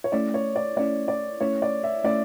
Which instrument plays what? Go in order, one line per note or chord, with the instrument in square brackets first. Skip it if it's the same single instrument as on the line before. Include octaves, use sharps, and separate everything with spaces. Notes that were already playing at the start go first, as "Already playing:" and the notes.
[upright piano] C#5
[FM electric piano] A3 C#4 E4 [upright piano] D5
[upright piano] C#5
D5
[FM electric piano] A3 C#4 E4 [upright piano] D5
[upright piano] D5
[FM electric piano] A3 C#4 E4 [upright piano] C#5
[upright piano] D5
E5
[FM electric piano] A3 C#4 E4 [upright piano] D5